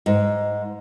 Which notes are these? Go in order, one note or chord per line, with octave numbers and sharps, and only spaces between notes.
G#2